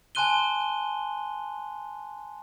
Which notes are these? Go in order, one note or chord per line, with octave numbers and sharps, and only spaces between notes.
G#5 A5 C6 F#6 D#7 G7